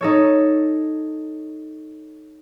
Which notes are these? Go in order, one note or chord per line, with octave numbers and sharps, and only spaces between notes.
D#4 A4 C#5